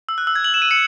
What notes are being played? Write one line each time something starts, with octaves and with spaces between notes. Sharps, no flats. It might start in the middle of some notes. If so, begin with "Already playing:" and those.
E6
F#6
E6
G#6
F#7
E7
D#7
C#7